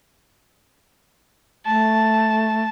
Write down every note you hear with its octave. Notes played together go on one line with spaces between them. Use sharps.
A3 A5